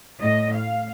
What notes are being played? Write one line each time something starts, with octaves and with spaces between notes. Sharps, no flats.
A2 D#5
F5